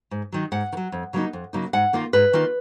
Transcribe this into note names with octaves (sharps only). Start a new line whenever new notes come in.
G#2
D#3 F#3
G#2 F#5
D#3
F#3
F2
C#3 F#3 A#3 D#4
F2
C#3 F#3 A#3 D#4
G#2 F#5
D#3 A#3 F4
G#2 B4
D#3 A#3 F4